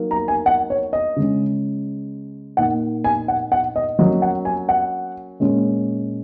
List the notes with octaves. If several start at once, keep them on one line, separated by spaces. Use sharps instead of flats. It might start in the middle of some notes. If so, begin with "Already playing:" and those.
Already playing: F#3 A#3 D#4
A#5
G#5
F#5
C#5
D#5
C#3 G#3 C#4
A#2 A#3 D#4 F#5
G#5
F#5
F#5
D#5
F#3 A#3 C#4 D#5
F#5
G#5
F#5
A#2 G#3 C#4